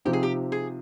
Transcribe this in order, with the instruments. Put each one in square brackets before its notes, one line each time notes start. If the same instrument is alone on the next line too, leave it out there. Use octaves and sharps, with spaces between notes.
[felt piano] C3 F3 C4 D#4 [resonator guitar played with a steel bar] G4
[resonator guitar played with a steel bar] G#4
G4
G#4